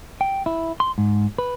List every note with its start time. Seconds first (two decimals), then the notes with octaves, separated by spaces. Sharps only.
0.21 G5
0.46 E4
0.80 C6
0.98 G#2
1.38 B4